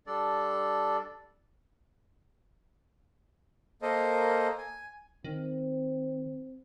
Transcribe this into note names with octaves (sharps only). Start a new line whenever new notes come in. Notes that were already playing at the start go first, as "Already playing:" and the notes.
G3 D4 A4 D5
A#3 A4 A#4 C5 D#5
G#5
D#3 C4